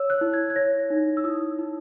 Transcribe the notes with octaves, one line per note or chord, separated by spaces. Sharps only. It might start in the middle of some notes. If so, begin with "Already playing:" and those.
Already playing: C#5 E6
F#6
E4
G#6
G#6
C#5 A#6
D#4
E6
E4 D#6
E4